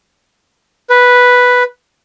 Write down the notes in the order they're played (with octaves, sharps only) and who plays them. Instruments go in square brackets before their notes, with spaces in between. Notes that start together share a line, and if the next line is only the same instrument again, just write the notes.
[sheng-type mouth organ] B4